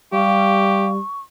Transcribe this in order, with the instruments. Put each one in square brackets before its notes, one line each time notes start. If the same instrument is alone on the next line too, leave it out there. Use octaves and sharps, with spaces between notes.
[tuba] G3 [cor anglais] G4 [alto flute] F5 [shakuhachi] C#6